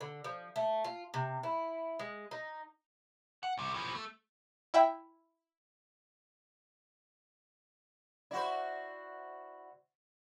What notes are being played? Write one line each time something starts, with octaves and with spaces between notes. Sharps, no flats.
D3
F3
A3
F4
C3
E4
G#3
D#4
F#5
C2 C3
E3 F3
A3
E4 E5 G5
E4 F#4 C5 D5